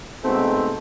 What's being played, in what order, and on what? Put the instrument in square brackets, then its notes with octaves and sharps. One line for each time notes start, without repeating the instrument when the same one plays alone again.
[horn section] G#2 B2 A3 C4